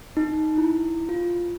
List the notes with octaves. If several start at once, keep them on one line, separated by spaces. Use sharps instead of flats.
D#4
E4
F4